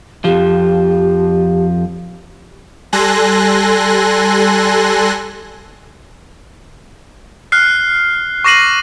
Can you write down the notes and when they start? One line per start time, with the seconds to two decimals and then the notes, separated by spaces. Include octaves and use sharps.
0.24 F2 F3 G4
2.93 G3 A4 G#5 C6 F#6 A#6
7.52 F6 F#6 C7
8.44 C#6 D6 A#6 C7 D#7 F#7